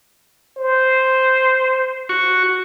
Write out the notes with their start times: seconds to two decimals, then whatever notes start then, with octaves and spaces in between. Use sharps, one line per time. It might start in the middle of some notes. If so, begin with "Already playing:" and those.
0.58 C5
2.09 F#4 C#6